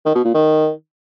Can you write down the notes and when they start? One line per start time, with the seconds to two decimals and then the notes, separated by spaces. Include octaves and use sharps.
0.06 D#3
0.15 B2
0.25 A#2
0.34 D#3